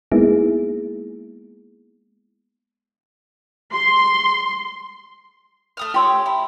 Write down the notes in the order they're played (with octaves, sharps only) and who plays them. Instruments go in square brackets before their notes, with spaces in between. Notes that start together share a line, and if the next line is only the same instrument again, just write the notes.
[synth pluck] G#3 A#3 B3 D#4 E4 G#4
[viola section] C6
[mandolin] A3 D#6 F6
[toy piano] F4 C6 E6 [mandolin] G4 C#5
[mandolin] E4